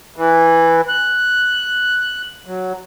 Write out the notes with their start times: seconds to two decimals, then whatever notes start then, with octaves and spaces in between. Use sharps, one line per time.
0.16 E3
0.88 F#6
2.46 F#3